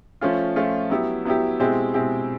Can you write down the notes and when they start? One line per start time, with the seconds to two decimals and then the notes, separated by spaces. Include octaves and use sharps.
0.21 F3 A3 C#4 F4
0.56 F3 A3 C#4 F4
0.90 F#3 B3 E4 G4
1.25 F#3 B3 E4 G4
1.59 B2 G#3 C4 E4 G4
1.94 B2 G#3 C4 E4 G4